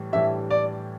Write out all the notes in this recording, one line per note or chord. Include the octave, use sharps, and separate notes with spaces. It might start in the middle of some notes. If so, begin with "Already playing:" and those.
Already playing: A2 E3 G3
A2 E3 G3 D4 G4 E5
D5